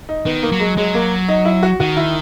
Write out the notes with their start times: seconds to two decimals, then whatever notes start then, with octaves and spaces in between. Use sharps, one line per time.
0.09 D#4
0.26 D#3 B3
0.43 A#3
0.52 F#3
0.60 G#3
0.77 F#3 G#3
0.94 A#3
1.28 D#4
1.45 E4
1.63 F#4
1.80 D#3 F#4
1.97 E4